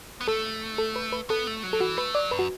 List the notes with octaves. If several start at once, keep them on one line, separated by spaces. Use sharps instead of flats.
B3
A3 A4
A4
B4
B4
B3 A4
A3
F#3
A4
E3 F#4
A3 B4
F#3 D5
F#2 B4
F#4